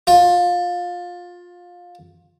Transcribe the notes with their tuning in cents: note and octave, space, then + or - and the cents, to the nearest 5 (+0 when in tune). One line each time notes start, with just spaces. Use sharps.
F4 +20